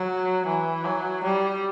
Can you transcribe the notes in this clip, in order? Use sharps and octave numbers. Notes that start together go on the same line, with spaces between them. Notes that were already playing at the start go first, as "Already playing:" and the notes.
Already playing: F#3
E3
F#3
G3